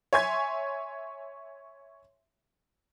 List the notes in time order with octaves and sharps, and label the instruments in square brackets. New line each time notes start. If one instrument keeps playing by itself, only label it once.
[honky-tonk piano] C#5 E5 G#5 C6 G#6